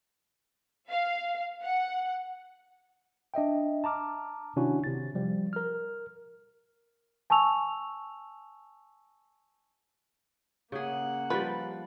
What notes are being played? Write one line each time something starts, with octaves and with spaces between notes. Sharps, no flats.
F5
F#5
D4 D#5 E5 G5
A5 A#5 D6 F6
C3 D#3 C#4 D4 E4 F#4
C3 A6
F3 G3
A#4 F6
G#5 A5 C#6 E6 F7
C#3 A#3 G#4 F#5
F3 G3 B4